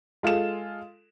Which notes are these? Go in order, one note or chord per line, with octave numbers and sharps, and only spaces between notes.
G#3 F4 A4 E7